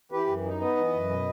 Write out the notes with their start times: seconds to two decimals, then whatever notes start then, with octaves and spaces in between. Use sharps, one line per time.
0.12 E3 G4 B4
0.27 F#2
0.44 D#4
0.60 B3 B4 D#5
0.77 E3
0.93 F#2
1.09 B2